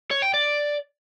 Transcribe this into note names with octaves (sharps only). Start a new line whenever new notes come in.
C#5
G5
D5